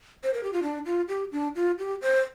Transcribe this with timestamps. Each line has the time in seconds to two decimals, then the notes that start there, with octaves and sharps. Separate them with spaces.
0.23 C5
0.34 A#4
0.43 G4
0.53 F4
0.63 D4
0.86 F4
1.09 G4
1.32 D4
1.55 F4
1.79 G4
2.02 C5